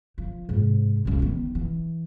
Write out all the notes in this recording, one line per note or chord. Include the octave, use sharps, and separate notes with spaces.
F3
G#2 C3
C#2 F#2
D#3 B3
E3